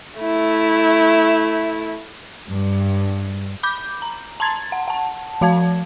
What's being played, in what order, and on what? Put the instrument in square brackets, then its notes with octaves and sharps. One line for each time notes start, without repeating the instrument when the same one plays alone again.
[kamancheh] A3 E4
[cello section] G2
[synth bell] B5 D6 G6
A#5
A5 A#5 C6 G#6 A6
F#5
F#5 A5
F3 F#4 F5 A5 G#6